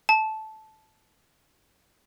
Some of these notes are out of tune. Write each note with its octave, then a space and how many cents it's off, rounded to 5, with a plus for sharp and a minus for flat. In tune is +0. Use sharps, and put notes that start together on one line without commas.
A5 -10